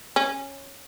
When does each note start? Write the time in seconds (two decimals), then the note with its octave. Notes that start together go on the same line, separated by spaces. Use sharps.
0.16 C#4